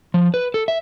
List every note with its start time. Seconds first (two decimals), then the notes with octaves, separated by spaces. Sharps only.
0.14 F3
0.34 B4
0.54 A4
0.68 E5